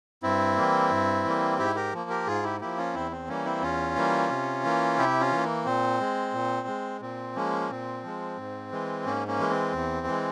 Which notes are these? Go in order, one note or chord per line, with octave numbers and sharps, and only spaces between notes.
G2 C4 E4
E3 G3 A#3
G2
E3 G3 A#3
G#2 E4 G4
G4 A#4
F3 A#3
G4 A#4
G#2 F4 G#4
E4 G4
F3 A#3 E4 G4
C#4 F4
E2 C4 E4
C4
E3 G3 A#3 C#4
C4 E4
E2 C#4 F4
E3 G3 A#3
C3
E3 A#3
C3 E4 G4
C#4 F4
E3 A#3
A#3
A#2 C4
G#3
A#2
G#3
A#2 C4
F3 G#3 A#3 C#4
A#2 C4
F3 G#3
G#2
E3 G#3
G#2 A#3 C#4
A#3 C#4
E3 G#3
C4
E2
E3 G#3